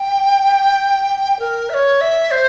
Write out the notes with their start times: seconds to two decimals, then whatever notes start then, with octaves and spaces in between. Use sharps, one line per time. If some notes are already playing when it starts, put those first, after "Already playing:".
Already playing: G5
1.39 A#4
1.70 E5
1.74 C#5
2.01 E5
2.31 C5